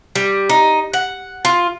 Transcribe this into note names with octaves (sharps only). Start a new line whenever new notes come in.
G3
D#4
F#5
F4